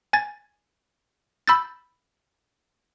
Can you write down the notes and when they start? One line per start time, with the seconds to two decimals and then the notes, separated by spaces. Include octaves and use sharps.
0.13 G#5 G#6 A6
1.48 B5 E6 G6 A6